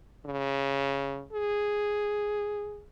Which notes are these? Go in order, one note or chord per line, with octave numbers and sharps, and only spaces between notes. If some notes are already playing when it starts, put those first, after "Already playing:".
C#3
G#4